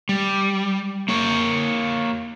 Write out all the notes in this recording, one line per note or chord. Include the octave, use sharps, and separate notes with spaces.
G3
A#3 C#5